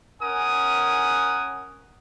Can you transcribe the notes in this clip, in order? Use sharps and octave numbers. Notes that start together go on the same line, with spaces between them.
C#4 A#4 F#5 G#5 D#6